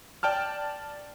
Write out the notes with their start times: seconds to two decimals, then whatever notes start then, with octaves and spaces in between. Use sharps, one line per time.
0.23 D5 G5 A5 F6